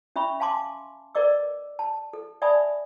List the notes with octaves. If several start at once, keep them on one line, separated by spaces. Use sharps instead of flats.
C#4 E5 B5 C#6
F5 G#5 A5 C6 D6
A#4 B4 D5 D#5 D6 E6
A5
A4
D5 E5 G#5 A5 B5 D#6